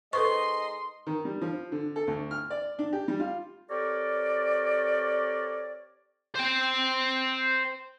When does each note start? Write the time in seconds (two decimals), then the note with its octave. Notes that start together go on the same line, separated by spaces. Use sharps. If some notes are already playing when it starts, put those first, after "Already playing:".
0.13 G#3 D#4 A4 B4 C5 D#5 C6 C#6
1.07 D#3
1.25 G3
1.41 F3
1.72 D3
1.96 A4
2.07 D2
2.31 F6
2.50 D5
2.79 D4
2.93 G4
3.08 G3
3.20 F4
3.70 C4 G4 A4 A#4 C#5 D5
6.35 C5 G5